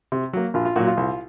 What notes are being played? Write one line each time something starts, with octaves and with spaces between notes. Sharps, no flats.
C3
F#3 A#3
A#1 F4
F4
A#2 F#3 F#4
F4
C2